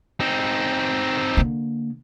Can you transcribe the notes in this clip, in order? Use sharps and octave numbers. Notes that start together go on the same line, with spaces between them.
C4 D#4
D3 A#3